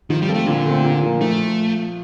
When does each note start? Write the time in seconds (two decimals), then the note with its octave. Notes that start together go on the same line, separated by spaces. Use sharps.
0.10 D#3 F3
0.22 G3
0.28 C4 F4 A4
0.34 A3
0.46 A#2 D3
0.65 A3 C4
0.84 A#2
1.03 F3 A#3
1.21 F3 A3